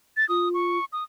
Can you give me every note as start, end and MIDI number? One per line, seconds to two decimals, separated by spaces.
0.17 0.27 93
0.29 0.78 65
0.29 0.49 87
0.54 0.85 85
0.93 1.04 87